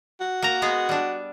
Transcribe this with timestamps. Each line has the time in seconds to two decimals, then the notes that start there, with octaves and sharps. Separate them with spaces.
0.21 F#4
0.42 A#3 A#5
0.62 G#3 B3 G#4
0.89 G3 D4